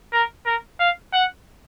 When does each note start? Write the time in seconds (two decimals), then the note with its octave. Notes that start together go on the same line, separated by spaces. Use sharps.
0.12 A#4
0.46 A#4
0.79 F5
1.13 F#5